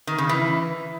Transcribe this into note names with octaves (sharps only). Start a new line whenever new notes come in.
D#3
C#3
E3